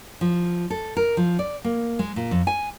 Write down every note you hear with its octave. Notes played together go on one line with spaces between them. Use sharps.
F3
A4
A#4
F3
D5
A#3
G#3
A#2
F2
G#5